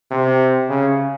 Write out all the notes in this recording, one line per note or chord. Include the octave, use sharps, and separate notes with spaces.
C3
C#3